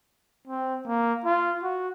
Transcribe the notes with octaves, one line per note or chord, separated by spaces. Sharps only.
C4
A#3
F4
F#4